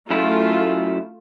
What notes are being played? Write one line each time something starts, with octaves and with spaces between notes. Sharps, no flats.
F#2 A3 E4 F4